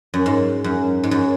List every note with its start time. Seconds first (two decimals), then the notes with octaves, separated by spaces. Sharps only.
0.14 F#2
0.26 G#2
0.64 F#2
1.03 G#2
1.11 F#2